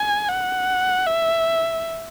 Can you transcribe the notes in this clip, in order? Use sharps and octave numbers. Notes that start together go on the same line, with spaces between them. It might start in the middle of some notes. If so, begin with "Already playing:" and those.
Already playing: G#5
F#5
E5